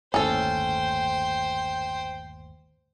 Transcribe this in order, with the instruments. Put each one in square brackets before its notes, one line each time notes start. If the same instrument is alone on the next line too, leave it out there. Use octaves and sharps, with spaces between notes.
[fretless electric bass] G1 D#2 A2 [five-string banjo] C#4 A4 [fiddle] C5 G5